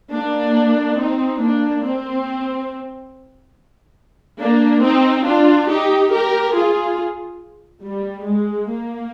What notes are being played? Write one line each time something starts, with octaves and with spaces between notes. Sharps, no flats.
A#3 D4
C4 D#4
A#3 D4
C4
A#3 D4
C4 D#4
D4 F4
D#4 G4
G4 A#4
F4 G#4
G3
G#3
A#3